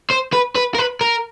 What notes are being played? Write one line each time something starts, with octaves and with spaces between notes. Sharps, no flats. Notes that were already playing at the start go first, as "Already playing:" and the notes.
C5
B4
B4
A#4
B4
A#4